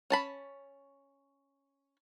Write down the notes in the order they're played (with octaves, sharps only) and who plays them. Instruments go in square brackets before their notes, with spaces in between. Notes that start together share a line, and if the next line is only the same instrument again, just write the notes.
[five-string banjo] C#4 A5 B5